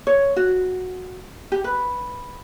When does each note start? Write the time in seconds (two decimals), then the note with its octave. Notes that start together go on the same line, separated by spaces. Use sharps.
0.07 C#5
0.36 F#4
1.52 G4
1.64 B4